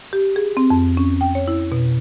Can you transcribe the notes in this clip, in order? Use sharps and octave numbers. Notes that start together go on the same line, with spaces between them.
G4
G#4
C4
F2
C#4
G5
C#5
E4
B2